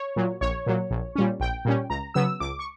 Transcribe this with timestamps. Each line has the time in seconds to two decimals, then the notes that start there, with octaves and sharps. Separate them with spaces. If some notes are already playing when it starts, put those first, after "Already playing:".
Already playing: C#5
0.16 A#2 F#3
0.41 A#1 C#5
0.66 A#2 F#3
0.91 A#1
1.15 A#2 G3 C#4
1.40 A#1 G5
1.65 A#2 G3 C#4
1.90 C#2 A#5
2.14 C#3 F#3 B3 E6
2.40 C#2 D6
2.59 C#6